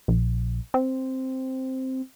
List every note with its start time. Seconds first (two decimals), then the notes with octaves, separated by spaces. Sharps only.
0.08 A#1
0.74 C4